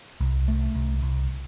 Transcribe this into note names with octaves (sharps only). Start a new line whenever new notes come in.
C2
A3
C2
C2